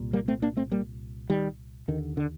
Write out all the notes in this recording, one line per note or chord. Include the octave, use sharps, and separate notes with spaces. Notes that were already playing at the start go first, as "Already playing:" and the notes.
Already playing: C2 A#2
G3 A#3
A3 C4
A#3 D4
A3 C4
G3 A#3
D#3 G3
D#2 D3 D#3
D3